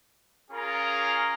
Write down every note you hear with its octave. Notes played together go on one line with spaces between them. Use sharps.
C#4 F4 G#4 A#4 A#5